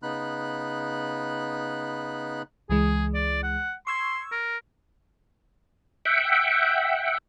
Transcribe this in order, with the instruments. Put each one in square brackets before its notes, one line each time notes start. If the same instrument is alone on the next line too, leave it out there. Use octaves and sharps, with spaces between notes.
[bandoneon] C#3 B3 D#4 B5 F#6
[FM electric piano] C#2 E3 G#3 [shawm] G#4
[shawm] D5
F#5
[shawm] C6 [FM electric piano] C#6 E6 G#6
[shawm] A#4
[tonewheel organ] E5 F#5 G5